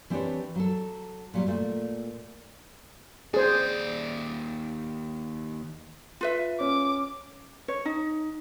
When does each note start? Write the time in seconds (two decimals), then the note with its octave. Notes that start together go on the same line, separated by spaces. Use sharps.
0.10 E3 C4 D4 G4 B4 C#5
0.56 F#3 A4
1.34 A#2 F#3 G3
1.47 A#2 A3
3.34 D#2 G#4 C5 D5
6.21 F4 B4 E5
6.60 C#4 D6
7.68 C#5
7.85 D#4